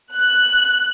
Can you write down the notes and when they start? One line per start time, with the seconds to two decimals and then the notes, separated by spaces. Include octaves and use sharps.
0.15 F#6